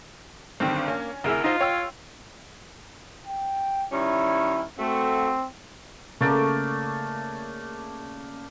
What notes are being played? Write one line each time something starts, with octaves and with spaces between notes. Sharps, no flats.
B1 G2 D3 D#3 C4
A#3 C#4
D2 C3 E4 G#4 A#4
D#4 F4 C5
C#5 G5 E6
G5
D#3 G3 C#4 E4
A3 C4 F#4
C#3 A3 A#3 D5